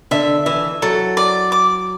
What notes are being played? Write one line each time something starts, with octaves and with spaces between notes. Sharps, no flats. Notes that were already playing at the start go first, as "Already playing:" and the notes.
D3 E5
E3 E5
F#3 A4
D5
D6